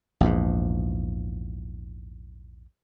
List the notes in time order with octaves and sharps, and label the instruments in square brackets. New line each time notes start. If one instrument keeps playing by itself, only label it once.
[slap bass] A#1 E2 G#2